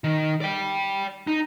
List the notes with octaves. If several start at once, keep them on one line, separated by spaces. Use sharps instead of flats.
D#3
D5 G5
D#4